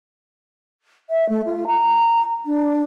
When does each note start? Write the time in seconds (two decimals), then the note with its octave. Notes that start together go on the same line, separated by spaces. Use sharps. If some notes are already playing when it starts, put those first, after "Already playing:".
1.10 E5
1.29 A3
1.46 F4
1.67 A#5
2.46 D4